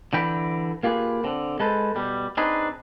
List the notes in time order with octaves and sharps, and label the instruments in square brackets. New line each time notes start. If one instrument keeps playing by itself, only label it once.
[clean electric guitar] D3 E3 G5 B5
A#3 F4 G4 G#4 B4
D3 C4
G#3 A4 B4 C5
B2 G3 G4
C4 D4 D#4 G#4 B4